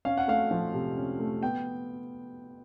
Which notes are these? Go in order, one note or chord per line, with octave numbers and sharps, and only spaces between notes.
C#4 F5
F#5
A3 F5
F3
C3
C#4
A3
B3 G5